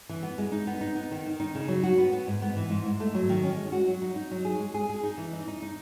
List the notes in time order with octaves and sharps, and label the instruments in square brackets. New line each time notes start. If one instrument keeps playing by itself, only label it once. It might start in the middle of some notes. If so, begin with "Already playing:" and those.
[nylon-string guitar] E3
B3
G#3
D#4
B3
D#4
B3
D#3
D#3
D#4
C#3
F#3
F#4
B3
B3
G#2
B3
E3
G#2
G#2
A3
F#3
D#3
C#4
G#3
F#4
F#3
D#4
D#4
F#3
G#4
G#3
G#4
G#4
D#4
E3
D#4
D#4
D#4